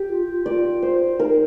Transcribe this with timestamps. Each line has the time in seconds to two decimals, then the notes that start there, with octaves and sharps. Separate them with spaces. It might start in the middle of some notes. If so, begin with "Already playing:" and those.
Already playing: G4
0.09 F4
0.28 F4
0.46 F4 D5
0.82 C5
1.20 D#4 A#4